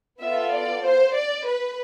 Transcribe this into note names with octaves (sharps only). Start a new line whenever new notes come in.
B3 F4 A4 E5
D5
C5
D5
B4